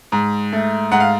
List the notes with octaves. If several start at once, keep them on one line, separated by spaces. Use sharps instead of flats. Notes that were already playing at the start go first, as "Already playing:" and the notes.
G#2
A3
G#2 F#5
F5